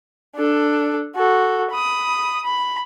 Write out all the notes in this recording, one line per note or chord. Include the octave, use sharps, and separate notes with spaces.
D4 A4
F#4 A4
B5 D#6
B5